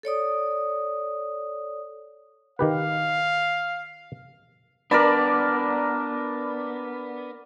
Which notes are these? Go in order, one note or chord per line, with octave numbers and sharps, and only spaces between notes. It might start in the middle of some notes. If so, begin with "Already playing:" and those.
A4 C#5 D5 D#6
D#3 G4 B4 F5
B3 D4 A#4 D5 B5